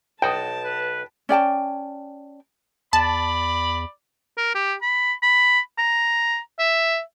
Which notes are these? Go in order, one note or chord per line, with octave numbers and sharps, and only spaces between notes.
B1 F#4 G5 A5 D#6
B4
C#4 D5 G5 A5
E2 D5 A5 B5
A#4
G4
B5
B5
A#5
E5